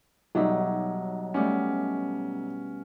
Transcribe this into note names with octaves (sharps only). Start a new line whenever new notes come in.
B1 F#3 G3 D#4 E5
B2 G3 A3 C#4